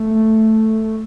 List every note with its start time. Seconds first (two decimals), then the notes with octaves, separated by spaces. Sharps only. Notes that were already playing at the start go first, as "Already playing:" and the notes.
Already playing: A3